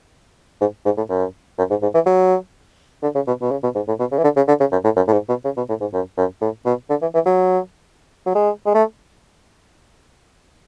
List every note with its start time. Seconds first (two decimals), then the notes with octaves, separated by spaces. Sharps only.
0.61 G#2
0.85 G#2
0.97 A2
1.09 F#2
1.58 F#2
1.70 G#2
1.82 G#2
1.94 E3
2.06 F#3
3.03 D3
3.15 C#3
3.27 B2
3.41 B2
3.51 C#3
3.63 B2
3.75 G#2
3.88 A2
3.99 B2
4.12 C#3
4.18 E3
4.24 D3
4.36 C#3
4.48 D3
4.60 C#3
4.72 F#2
4.84 A2
4.96 F#2
5.08 A2
5.13 G#2
5.29 B2
5.45 C#3
5.57 B2
5.69 A2
5.81 G#2
5.93 F#2
6.17 F#2
6.41 A2
6.65 B2
6.90 D3
7.02 E3
7.14 E3
7.26 F#3
8.26 F#3
8.35 G#3
8.66 G#3
8.74 A3